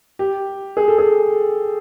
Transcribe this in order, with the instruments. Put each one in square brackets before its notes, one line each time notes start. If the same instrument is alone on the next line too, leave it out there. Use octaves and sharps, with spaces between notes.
[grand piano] G4
G#4
A4
G#4